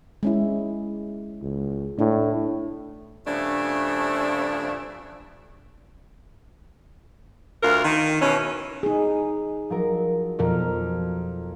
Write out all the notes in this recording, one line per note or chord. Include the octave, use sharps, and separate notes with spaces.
G#3 C#4 E4
C#2
A2 D4
G2 C#3 F3 A3 D4 E5
D2 F4 A#4
D#3
B2 E3 C#4
D#4 G#4
F3 F#3 A#4
F2 B2 F3 A#4